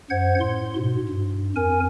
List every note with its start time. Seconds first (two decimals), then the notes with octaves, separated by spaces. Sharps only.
0.10 F#2 C5 F#5 G#6
0.40 A2 C6
0.77 G#2 B2
1.09 G2
1.56 F2 A#4 G#5